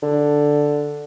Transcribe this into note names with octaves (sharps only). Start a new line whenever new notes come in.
D3